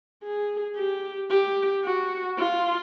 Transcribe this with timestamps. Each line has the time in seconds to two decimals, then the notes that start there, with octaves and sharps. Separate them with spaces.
0.23 G#4
0.77 G4
1.30 G4
1.85 F#4
2.39 F4